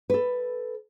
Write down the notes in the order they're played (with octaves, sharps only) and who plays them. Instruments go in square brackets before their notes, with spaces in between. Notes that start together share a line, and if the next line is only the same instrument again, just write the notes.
[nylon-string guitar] A4 B4